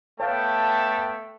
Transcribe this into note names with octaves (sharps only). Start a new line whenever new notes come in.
A3 B3 C#5 F5 G5 A5